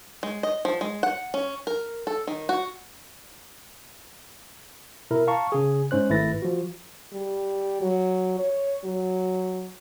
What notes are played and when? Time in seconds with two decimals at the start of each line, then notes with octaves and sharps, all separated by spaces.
0.23 G#3
0.43 D#5
0.65 F3
0.81 G#3
1.03 F#5
1.34 C#4
1.67 A#4
2.07 A4
2.27 D#3
2.49 F#4
5.11 B2 E4 A#4
5.27 F5 A5 A#5 C#6
5.52 C#3 G#4
5.91 G#2 C#4 C5 F#6
6.10 G#1 A3 E4 B4 A6 A#6
6.42 F3 F#4
7.13 G3
7.81 F#3
8.39 C#5
8.84 F#3